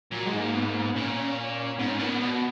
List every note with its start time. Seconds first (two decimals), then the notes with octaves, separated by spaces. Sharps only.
0.11 A#2 F#3
0.26 G#3
0.33 G#2
0.39 A#3
0.54 B3
0.68 A#3
0.82 B3
0.95 A#2 C#4
1.79 G#2 B3
1.89 C#4
2.00 A#2 B3
2.20 B2